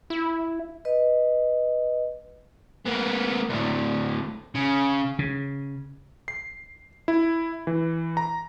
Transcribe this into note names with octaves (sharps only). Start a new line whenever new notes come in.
E4
B4 D#5
A#3 B3
D2 A2
C#3
C#3
C7
E4
E3
A#5